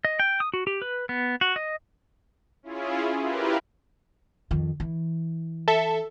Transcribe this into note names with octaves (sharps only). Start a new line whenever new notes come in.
D#5
G5
D#6
F#4
G4
B4
B3
F#4
D#5
C#4 E4 F4 G#4
E4 F4 G4 A#4 B4
F2 D#3
E3
A4 E5